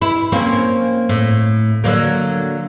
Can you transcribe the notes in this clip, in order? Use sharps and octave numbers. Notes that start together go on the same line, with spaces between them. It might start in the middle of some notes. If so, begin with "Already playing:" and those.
E4
A#3 C4 C#4
A2
D3 F#3 A#3